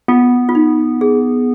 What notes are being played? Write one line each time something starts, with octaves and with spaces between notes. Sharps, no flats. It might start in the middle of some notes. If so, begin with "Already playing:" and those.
B3 F4
F4
D#4
G#4